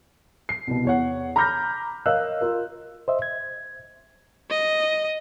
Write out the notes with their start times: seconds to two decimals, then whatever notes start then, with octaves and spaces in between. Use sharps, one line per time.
0.49 C7
0.67 C2 B2
0.85 E2 C#5 F#5
1.36 A#5 B5 D6 F6 G6 A#6
2.06 A#4 C#5 D#5 F5 E6 F#6
2.41 F4 A#4
3.08 C5 D#5 E5
3.22 G#6
4.51 D#5